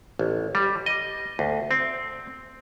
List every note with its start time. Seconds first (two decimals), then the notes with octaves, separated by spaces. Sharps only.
0.19 A1
0.55 G3
0.86 D#5
1.39 D2
1.71 C4